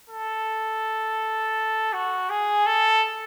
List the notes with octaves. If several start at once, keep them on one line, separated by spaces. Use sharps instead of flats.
A4
F#4
G#4
A4